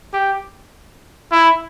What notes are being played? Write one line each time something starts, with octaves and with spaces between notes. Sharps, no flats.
G4
E4